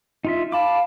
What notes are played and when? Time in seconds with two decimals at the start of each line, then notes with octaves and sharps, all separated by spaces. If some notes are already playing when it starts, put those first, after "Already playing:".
0.25 D#4 F4 E5
0.52 F5 A5 B5 D6